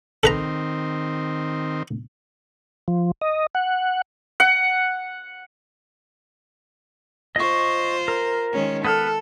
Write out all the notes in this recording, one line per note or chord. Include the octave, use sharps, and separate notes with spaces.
D#3 C4 A4 B4 A#5
F3
D#5
F#5
F#5
F4 C5 D#5 C#6
A#4
D#3 G#3 C#4
B3 A4 F#5 F6